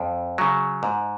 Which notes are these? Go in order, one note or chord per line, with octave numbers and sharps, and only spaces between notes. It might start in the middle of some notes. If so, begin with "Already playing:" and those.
Already playing: F2
C#3 F#3
G#2